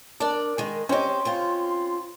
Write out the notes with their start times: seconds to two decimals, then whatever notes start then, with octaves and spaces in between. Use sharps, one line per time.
0.20 D4 A#4 D5 A5
0.58 D#3 G#3
0.89 C4 C#4 G4 C#5 D#5 C6
1.25 C#3 C4 F4